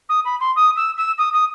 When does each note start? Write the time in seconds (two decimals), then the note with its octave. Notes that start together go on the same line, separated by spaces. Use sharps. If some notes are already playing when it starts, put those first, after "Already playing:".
0.09 D#6
0.24 B5
0.40 C6
0.55 D#6
0.76 E6
0.97 E6
1.18 D#6
1.33 D#6